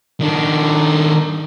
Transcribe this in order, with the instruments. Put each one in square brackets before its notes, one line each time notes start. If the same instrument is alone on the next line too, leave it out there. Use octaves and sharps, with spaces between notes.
[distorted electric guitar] D#3 D4